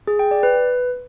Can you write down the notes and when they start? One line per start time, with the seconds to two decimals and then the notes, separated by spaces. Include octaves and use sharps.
0.07 G#4
0.19 G5
0.31 D5
0.43 B4